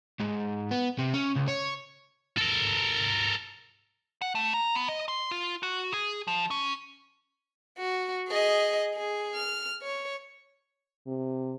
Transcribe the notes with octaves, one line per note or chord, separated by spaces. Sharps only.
G#2
B3
C3
C#4
C#2
C#5
A4 A#4
F#5
A3
A#5
B3
D#5
C6
F4
F#4
G#4
F3
C#4
F#4
G#4 D#5
G#4
F6
C#5
C3